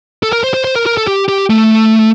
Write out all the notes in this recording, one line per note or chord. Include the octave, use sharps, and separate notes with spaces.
A4
A#4
C5
C5
C5
A#4
A#4
A4
G4
G4
A3